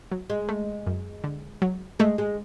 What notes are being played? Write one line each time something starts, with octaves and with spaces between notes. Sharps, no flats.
F#3
G#3
A3
F#2
D3
F#3
G#3 A3
G#3